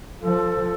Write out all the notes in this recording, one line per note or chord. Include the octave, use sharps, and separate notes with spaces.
F3 A4